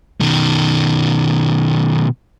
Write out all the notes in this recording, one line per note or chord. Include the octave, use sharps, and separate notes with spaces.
B2 D#3